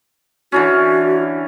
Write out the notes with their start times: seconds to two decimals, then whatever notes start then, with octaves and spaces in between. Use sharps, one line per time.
0.52 D3 E3 C#4 F#4